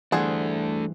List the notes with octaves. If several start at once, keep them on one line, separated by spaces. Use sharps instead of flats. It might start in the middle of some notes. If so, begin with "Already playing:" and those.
E2 G2 E3 A3 D4 G#4 C5 F#5